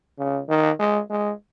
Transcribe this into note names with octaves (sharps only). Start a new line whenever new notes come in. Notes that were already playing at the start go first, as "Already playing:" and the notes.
C#3
D#3
G#3
G#3